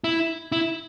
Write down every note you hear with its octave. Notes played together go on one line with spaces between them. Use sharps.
E4
E4